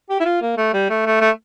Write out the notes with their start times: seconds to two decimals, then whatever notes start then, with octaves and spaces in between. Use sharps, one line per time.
0.10 G4
0.21 E4
0.26 F4
0.42 A#3
0.57 A3
0.74 G3
0.90 A3
1.06 A3
1.21 A3